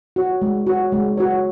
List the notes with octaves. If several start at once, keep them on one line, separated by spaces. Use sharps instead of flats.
F#4 C#5
G#3
F#4 C#5
G#3
F#4 C#5